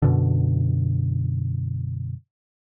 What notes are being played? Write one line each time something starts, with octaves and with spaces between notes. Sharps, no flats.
F#2 B2 D3